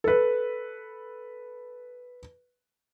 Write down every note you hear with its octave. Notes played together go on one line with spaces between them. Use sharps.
A4 B4